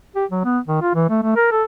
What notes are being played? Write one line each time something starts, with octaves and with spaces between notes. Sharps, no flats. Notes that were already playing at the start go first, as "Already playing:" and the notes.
G4
F#3
B3
D#3
F4
E3
A3
A3
A#4
A4